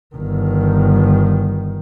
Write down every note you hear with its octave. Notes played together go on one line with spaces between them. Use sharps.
G1 D#3